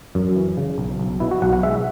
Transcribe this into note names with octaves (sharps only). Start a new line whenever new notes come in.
F#2
E3
C#3
B1
B1
B2 E4
F#4
B1 F#5
F#5
G#3 E5